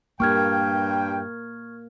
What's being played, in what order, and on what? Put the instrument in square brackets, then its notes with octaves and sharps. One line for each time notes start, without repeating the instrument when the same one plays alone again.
[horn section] G2 G5 [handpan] A#3 [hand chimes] C#6 F6 G#6